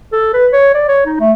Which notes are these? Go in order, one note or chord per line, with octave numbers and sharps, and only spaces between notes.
A4
B4
C#5
D5
C#5
D#4
A3